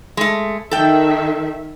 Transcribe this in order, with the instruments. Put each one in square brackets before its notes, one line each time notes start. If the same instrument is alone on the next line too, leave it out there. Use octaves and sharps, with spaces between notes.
[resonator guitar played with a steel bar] G#3 A3
[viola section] D#3 E5 [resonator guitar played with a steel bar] A4 G5